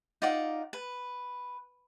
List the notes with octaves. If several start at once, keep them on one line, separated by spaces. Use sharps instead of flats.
D#4 F4 D5 F#5
B4